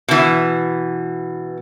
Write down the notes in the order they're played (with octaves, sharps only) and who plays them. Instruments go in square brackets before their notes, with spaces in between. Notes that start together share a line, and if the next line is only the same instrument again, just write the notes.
[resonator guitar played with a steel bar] B2 E3